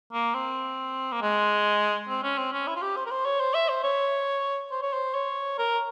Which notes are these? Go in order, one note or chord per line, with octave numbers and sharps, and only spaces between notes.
A#3
C4
A#3
G#3
C4
C#4
C4
C#4
E4
F4
G4
C5
A#4
C5
C#5
C5
E5
C5
C#5
C5
C#5
C5
C#5
A#4